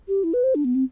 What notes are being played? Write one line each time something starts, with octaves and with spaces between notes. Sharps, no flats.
G4
E4
B4
C5
D4
B3
C4